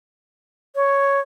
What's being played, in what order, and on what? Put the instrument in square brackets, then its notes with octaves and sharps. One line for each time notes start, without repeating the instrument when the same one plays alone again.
[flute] C#5